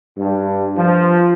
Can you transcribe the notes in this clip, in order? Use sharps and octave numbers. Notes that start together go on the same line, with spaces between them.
G2
F3